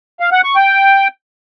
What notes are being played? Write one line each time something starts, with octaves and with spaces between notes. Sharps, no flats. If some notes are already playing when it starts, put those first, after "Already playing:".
F5
F#5
C#6
G5